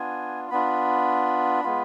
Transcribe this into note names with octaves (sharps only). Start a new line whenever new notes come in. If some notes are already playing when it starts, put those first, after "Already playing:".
Already playing: B3 D4 F4 G#5
B3 D4 F4 B5
G#3 B3 F4